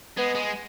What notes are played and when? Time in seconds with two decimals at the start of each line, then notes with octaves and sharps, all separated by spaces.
0.17 G#3 B3
0.35 G#3